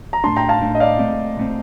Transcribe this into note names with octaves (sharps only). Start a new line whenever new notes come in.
A#5
A2 A3 D4 A5 C6
G5 A#5
F5 A5
A2 A3 D4
D#5
D5 F5
A#2 A3 C4
A#2 A3 C4